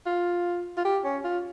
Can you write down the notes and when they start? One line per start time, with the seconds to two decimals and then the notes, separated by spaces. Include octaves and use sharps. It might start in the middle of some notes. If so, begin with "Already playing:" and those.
0.06 F4
0.77 F4
0.85 G4
1.04 C#4
1.24 F4